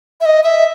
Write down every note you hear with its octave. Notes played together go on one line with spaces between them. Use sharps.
E5
D#5
E5